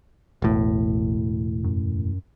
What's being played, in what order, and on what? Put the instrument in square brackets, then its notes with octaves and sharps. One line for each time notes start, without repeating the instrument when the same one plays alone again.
[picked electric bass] E1 A2 [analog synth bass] A1
[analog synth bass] F#2